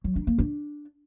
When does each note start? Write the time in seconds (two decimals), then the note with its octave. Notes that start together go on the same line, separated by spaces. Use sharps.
0.04 F#3
0.16 D4
0.27 A#3
0.39 D4